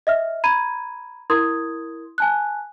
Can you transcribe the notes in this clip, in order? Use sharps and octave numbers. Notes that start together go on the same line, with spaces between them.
D#5 E5 F6
A#5 B5 G#6 D#7
E4 A#4 C6 D#6 G#6
G#5 A5 F#6